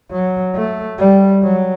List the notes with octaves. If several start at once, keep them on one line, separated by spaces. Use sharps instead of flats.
F#3
A3
G3
F#3